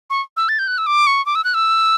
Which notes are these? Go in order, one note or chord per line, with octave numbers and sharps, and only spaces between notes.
C#6
E6
A6
G6
F#6
E6
D6
C#6
D6
E6
F#6
E6